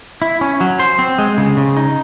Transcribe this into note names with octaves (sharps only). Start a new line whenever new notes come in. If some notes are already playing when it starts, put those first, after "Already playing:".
E4
C#4
F#3
C5
C4
G#3
C#3
C#3
D#4